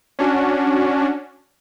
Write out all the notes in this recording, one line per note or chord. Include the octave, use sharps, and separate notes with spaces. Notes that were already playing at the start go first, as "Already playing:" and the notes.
C#4 D4 F#4